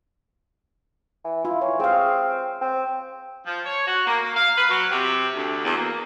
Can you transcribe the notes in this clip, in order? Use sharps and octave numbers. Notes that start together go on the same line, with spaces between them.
E3
E4 F4
E3 C#5
C4 G#4 F5
C4
F3
C#5
F#4
A#3
A#3
F5
B4
F#3
C3
D2
E2
A#3